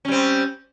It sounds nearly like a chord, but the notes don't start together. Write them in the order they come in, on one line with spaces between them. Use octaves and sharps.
C#4 G3 C4